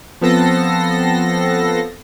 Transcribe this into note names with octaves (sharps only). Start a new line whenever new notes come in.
F3 B3 C4 A4 A#6 C7